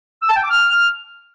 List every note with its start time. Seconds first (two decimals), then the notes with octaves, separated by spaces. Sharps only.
0.22 E6
0.29 A5
0.36 G5
0.43 D6
0.50 F6